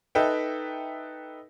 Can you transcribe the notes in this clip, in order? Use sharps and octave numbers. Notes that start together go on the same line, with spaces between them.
D#4 A4 B4 E5 G5